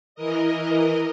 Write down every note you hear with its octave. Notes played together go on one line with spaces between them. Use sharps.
E3 A#4 D#5